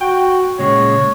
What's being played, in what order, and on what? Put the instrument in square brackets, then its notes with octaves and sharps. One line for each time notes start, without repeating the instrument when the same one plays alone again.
[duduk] F#4 [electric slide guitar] G5
[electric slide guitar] A#2 C#3 G#3 [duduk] C#5